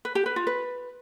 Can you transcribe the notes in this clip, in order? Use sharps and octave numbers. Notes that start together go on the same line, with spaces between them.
B4
G4
B4
F4
B4